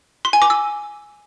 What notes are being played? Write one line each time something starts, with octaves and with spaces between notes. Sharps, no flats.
C6
G#5
D6
E6